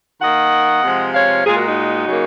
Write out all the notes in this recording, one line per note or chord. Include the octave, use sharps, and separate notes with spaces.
D#3 A#3 D#5 F#5
C3 F3 G#3
C#5 F5
A#2 G#3 F4 G#4
F#4 A#4
D#4 F#4
C#3 F#3 A#3